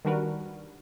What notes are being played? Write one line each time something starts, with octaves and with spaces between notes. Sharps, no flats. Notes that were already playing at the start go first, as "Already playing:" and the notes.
D#3 G3 D4 F#4 A#4 B4